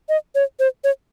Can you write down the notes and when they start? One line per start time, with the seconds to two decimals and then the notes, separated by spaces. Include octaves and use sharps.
0.09 D#5
0.35 C#5
0.60 C5
0.84 C#5